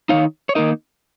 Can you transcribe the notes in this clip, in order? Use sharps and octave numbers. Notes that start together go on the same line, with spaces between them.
D#3 G#3 D#4 C#5 F5
C#5
D#3 A#3 D#4 A#4 D#5